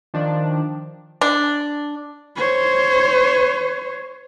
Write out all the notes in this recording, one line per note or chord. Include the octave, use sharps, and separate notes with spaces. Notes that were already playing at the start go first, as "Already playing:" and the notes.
D#3 F3 D4
D4
C5 C#5